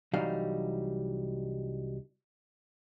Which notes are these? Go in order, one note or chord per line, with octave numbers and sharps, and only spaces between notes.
C2 E3 F#3 G3 D#4 F5